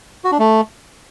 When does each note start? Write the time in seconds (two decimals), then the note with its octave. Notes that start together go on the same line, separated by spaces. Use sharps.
0.24 F#4
0.32 D4
0.39 A3